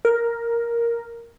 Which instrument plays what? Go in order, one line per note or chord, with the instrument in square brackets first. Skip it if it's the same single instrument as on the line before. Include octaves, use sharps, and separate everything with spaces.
[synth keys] A#4